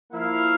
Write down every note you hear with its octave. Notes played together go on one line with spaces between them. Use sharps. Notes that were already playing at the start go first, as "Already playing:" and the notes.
F3 A#3 E4 F5